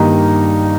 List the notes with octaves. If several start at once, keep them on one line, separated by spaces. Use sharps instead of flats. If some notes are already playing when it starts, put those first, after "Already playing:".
Already playing: G2 D#3 G3 A#3 D#4